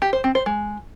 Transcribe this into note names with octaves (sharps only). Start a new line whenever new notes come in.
G4
C5
C4
C5
G#3